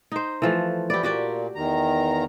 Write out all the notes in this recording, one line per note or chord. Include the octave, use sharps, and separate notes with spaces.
D#4 C5
E3 F3 A3
B3 E4 G4 D5
A#2 F#4 G4 D5
E2 D#3 A#5